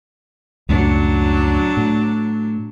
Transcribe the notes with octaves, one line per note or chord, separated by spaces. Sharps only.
C#2 F#2 A2 F#3 D4
A2